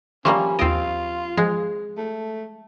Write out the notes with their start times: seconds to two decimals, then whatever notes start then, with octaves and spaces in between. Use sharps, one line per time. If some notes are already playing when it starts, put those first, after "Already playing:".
0.25 F3 G3 A#3 C#4 C6 C#6
0.59 D#2 C4 F4 D#5 D7
1.37 F3 G#3
1.97 A3